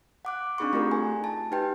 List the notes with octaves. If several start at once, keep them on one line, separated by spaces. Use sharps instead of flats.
F#5 D6 F#6
C4 D4 D#4 G#4 B5 C#6
A3 F4 G4 A#4
G#5
A5
D#4 G4 B4 G5